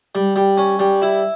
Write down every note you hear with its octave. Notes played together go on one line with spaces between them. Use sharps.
G3
G3
C#4
G3
E4